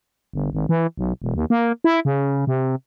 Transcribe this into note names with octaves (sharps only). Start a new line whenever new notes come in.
G1
G#1
E3
B1
E1
D#2
A#3
E4
C#3
C3